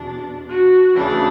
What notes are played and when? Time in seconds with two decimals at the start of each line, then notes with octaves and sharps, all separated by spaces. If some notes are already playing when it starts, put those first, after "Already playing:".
Already playing: E2 B2 D4
0.49 F#4
0.95 D2 C#3 E3 D4